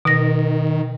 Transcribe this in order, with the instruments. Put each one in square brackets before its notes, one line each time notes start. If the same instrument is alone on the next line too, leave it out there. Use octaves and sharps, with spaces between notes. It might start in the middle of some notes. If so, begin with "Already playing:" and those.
[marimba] B2 A#6 [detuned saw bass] D#3